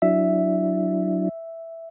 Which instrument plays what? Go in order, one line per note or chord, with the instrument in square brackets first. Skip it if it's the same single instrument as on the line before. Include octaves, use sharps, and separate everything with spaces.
[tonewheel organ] F#3 D4 E4 [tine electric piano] E5